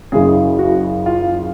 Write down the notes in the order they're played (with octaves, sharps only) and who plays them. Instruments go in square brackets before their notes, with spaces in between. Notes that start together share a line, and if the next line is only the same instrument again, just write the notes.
[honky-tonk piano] F#1 F#2 C#3 [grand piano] G#4
[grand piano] F#4
F4